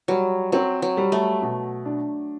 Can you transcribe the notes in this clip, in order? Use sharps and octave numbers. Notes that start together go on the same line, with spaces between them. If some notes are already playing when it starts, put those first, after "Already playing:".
F#3 G3
F#3 C4
F#3
G3
A3
B2
D4